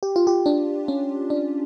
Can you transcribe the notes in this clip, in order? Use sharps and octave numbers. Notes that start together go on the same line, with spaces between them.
G4
F4
G4
D4
C#4
D4